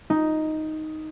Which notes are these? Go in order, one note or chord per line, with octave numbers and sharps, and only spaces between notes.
D#4